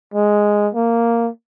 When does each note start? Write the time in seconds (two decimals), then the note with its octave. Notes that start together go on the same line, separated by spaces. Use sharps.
0.14 G#3
0.75 A#3